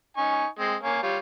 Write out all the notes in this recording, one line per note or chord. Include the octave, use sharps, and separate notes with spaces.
D#4 G#5 C#6
G#3 C4
A#3 C#5 G#5
G3 F4 C#5